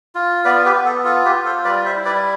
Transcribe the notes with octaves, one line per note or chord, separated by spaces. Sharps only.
F4
B3 B4 D5
G4 B4
B3
A4
F4 A4
G4 B4
F4
A4 C5
G3 B4 D5
C5 E5
E4
B4 D5